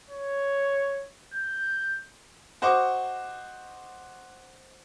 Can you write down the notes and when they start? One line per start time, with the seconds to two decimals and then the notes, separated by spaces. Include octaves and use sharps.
0.10 C#5
1.34 G6
2.62 F#4 C5 D#5 C#6 D6